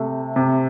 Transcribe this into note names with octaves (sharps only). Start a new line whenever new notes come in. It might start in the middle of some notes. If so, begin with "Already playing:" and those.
Already playing: C3 A3
C3